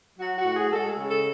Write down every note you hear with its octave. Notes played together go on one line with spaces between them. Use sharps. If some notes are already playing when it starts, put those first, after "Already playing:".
F#3 F#4
F#4
A2
G#4
G#3 A4
C#3
A4